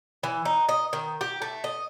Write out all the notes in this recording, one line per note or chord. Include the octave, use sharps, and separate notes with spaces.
E3
D#4
D#5
D#3
G4
A3
D#5